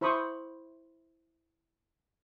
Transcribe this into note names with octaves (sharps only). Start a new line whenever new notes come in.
E4 C5 B5 C#6 D#6